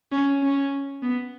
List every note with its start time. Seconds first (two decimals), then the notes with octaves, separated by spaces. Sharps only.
0.12 C#4
0.43 C#4
1.03 B3